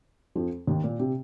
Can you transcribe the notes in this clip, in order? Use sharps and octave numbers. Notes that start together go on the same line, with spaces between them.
F2 F3
D#2 D#3
A#2
C3